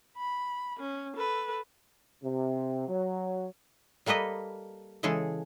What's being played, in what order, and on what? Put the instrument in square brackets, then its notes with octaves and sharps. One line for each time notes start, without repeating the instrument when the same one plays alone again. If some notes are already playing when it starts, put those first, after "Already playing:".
[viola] B5
C#4
A4 B4
[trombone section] C3
F#3
[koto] G3 A#3 A4 B4 D#5
C#3 E3 G#3 G#4 A4